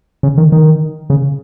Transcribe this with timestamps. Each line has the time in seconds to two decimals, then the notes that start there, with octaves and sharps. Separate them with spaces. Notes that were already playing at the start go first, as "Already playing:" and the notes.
0.23 C#3
0.38 D#3
0.52 D#3
1.10 C#3